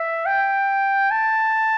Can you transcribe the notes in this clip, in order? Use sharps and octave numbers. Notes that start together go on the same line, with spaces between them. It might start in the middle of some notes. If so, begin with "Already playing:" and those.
Already playing: E5
G5
A5